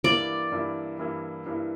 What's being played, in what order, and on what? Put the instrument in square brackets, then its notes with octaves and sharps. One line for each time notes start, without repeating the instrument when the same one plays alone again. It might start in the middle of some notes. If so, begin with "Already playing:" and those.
[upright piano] G2 E3 A#3 E4 [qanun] D5
[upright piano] G2 E3 A#3 E4
G2 E3 A#3 E4
G2 E3 A#3 E4